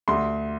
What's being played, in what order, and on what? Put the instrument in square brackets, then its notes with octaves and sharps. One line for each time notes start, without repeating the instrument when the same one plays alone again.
[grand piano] D2 C6